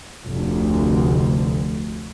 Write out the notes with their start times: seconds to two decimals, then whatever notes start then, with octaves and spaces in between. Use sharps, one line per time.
0.28 F1 D2